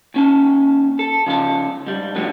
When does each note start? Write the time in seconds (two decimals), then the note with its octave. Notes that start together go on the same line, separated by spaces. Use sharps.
0.14 D#2 C#4 A5
0.99 A4
1.27 C#3 F3 F5 A5
1.87 G#2 G3
2.15 A2 D3 F3 F#4